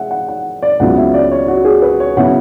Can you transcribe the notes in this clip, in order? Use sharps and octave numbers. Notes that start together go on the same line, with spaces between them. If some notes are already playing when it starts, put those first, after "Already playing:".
Already playing: G#3 E5 F#5
F#5
F#5
D5
C#2 C#3 F#3 B3 E4 F#5
E5
D5
C#5
F#4
G#4
B4
C#5
C#3 F#3 B3 E4 F#5